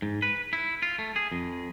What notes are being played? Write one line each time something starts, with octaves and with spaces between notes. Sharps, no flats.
G#2
B4
E4
F4
A3
G#4
F2